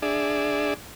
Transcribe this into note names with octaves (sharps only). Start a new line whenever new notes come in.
D4 G#4 D5 E5